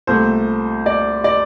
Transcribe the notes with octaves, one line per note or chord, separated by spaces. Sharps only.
C2 A#2 A3 C5
D5
D5